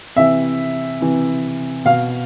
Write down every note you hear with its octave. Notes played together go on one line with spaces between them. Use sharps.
C3 E3 E5
C3 E3
B2 F5